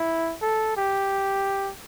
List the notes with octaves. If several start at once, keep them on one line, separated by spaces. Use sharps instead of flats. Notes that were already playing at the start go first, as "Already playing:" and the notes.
Already playing: E4
A4
G4